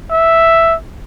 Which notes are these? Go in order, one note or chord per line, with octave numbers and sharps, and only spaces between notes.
E5